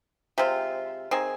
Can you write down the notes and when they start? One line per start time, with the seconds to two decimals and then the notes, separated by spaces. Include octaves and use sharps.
0.38 C3 G#3 C4 F4
1.11 D#3 C4 G#4